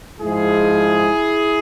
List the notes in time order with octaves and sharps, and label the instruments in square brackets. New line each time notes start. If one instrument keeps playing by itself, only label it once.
[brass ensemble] G#2 F3 G#3 E4 G#4